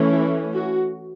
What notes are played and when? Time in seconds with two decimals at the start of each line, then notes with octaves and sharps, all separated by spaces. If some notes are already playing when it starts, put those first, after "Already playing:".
Already playing: E3 A3 C#4
0.12 E4
0.53 F#4